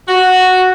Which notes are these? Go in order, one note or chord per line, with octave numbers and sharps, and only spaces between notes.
F#4